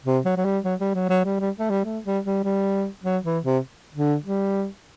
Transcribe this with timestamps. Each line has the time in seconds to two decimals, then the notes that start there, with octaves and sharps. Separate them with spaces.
0.05 C3
0.25 F#3
0.37 F#3
0.45 G3
0.65 F#3
0.80 G3
0.95 F#3
1.09 F#3
1.25 G3
1.40 G3
1.59 A3
1.70 G3
1.85 A3
2.05 G3
2.25 G3
2.45 G3
3.04 F#3
3.25 E3
3.44 C3
3.95 D3
4.25 G3